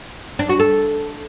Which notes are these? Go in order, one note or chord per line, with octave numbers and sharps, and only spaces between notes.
D4
F#4
A4